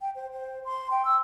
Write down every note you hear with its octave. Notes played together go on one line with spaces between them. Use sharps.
G5
C5
C5
C6
G5
E6